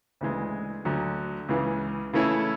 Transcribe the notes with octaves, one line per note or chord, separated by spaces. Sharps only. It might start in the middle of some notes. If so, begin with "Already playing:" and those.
D2 C#3 E3 G#3
D2 D3 F#3
C#2 C#3 E3
C#3 E3 A3 C#4 E4